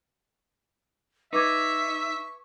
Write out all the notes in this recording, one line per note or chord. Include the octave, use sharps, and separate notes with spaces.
D#4 B4 E5 C#6 D6 G#6